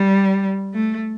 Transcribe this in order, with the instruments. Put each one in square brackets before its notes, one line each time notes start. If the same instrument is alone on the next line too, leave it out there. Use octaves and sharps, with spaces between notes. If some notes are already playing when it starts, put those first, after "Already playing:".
Already playing: [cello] G3
A3